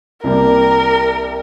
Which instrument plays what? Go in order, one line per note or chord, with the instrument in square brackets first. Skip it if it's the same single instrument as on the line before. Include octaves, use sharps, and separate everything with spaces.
[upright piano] C2 C3 G3 A#3 [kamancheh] A#4